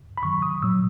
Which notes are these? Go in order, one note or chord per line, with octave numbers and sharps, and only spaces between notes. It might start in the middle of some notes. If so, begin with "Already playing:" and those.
B5
F#2 D#3 F#3 C#6
D#6
A#2 F#3 E6